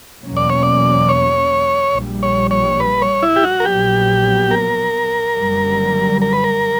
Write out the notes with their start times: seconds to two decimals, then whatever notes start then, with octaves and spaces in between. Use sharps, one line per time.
0.23 E2 B2 F#3 A#3 C#4
0.37 D5
0.50 C#5
0.63 D5
1.09 C#5
1.94 A#1 A#2 G3
2.23 C#5
2.51 C#5
2.80 B4
3.02 C#5
3.23 E4
3.36 G4
3.44 F#4
3.60 A#4
3.65 A#1 A#2 F#3 B3 G4
4.51 A#4
5.36 F#1 F#2 D3 G3
6.22 A#4
6.33 B4
6.44 A#4